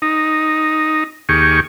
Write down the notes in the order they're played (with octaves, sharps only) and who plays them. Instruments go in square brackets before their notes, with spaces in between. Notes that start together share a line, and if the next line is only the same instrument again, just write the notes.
[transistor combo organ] D#4
D#2 G4 G#4 C#6